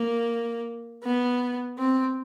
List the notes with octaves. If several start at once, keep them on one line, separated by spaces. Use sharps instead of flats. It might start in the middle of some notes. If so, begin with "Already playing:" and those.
Already playing: A#3
B3
C4